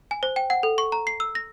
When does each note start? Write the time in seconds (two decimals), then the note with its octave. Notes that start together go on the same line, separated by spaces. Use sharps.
0.11 G#5
0.23 C5
0.36 G5
0.50 F#5
0.63 A4
0.78 C#6
0.92 A#5
1.07 C7
1.20 E6
1.35 A#6